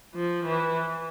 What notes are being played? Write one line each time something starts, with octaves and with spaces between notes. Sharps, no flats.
F3
E3